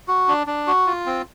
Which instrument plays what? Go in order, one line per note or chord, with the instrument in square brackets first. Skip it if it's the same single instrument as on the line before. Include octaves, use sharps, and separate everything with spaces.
[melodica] F#4
D4
D4
F#4
F4
C4